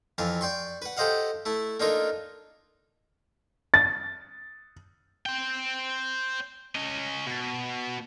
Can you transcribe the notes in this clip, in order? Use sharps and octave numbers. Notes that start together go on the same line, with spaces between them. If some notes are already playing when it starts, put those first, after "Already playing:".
F2 E3 F5 A5
D5 G5 C6 C#6
B4 F#5
G4 A4 C5 D#5 F5 F#5
A3 E4 A5
A#3 D4 D#4 F4 A4 A#4
A6
C5 G5
C#4 D#5
B2